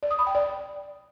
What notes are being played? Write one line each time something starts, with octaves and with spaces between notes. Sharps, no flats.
D5
D#6
B5
G5
D5